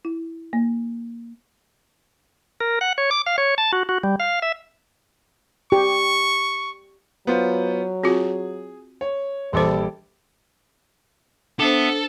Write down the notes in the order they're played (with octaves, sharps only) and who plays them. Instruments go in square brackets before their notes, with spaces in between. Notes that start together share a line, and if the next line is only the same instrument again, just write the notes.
[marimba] E4
A#3
[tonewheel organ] A#4
F#5
C#5
D6
F5
C#5
A5
F#4
F#4
G3
F5
E5
[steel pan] G4 [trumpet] C#6
[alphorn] F#3 [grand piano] B3 F4 C5
[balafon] C4 F4 F#4 [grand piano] G#4
[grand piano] C#5
[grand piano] A#1 A4 D6 [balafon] E3 C5 [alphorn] G3
[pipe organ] B3 E5 [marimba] D4 C5 [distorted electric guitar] A4